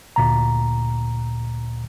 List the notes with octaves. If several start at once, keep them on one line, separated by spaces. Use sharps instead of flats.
D2 A#2 A#5